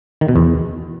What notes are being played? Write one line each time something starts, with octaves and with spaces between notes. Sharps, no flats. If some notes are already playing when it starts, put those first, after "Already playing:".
D#3
B2
E2